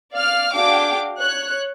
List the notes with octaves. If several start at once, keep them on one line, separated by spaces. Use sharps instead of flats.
D5 F5 F6
D4 F#4 G#4 F5 G5 D6
C#5 F#6